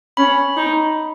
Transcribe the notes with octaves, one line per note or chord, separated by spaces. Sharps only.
C#4 B5
D#4